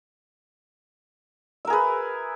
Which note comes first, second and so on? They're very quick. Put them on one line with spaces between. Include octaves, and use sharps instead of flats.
E5 A#4 G#4 B4